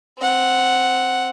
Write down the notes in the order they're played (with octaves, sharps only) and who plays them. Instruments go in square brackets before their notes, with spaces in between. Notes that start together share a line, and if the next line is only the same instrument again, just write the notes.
[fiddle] C4 F#5